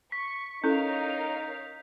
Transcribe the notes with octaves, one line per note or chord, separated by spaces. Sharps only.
C#6 B6
C#4 D#4 E4 A4 A#4 C#5 F5 G6